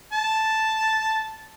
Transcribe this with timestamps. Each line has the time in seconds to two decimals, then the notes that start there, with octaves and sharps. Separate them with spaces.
0.12 A5